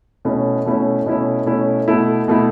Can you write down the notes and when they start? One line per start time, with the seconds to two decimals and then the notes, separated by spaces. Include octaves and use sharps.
0.25 B2 A3 C#4 E4
0.65 B2 A3 C#4 E4
1.06 B2 A3 C#4 E4
1.46 B2 A3 C#4 E4
1.88 B2 A3 E4
2.28 B2 A3 E4